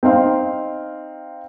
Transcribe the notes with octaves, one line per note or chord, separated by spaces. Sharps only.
C4 D#4 F5 C6